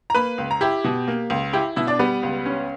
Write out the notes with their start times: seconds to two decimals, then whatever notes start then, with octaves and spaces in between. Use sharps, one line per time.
0.10 A#5
0.15 A#3 B4 B5
0.38 C#2
0.51 A#5
0.61 E4 G4 G5
0.84 B2
1.08 A#3
1.30 C#2
1.53 E4 G4 G5
1.76 B2 E4 E5
1.87 D4 D5
1.99 G3 B3 B4
2.23 C#2
2.46 C#4